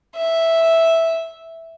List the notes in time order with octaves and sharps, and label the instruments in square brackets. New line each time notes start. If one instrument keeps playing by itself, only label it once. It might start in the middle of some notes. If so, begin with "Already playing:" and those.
[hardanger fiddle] E5